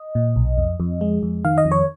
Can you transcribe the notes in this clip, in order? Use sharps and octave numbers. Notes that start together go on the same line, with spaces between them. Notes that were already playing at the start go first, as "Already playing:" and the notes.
Already playing: D#5
A#2
B1
F2
F2
G#3
F2
D#3 F5
D#5
F2
C#5